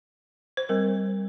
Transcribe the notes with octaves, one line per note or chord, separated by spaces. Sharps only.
C5
G3 C4 A#4